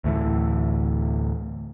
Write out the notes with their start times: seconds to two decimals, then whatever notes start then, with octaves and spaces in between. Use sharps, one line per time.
0.04 D2 A2 E3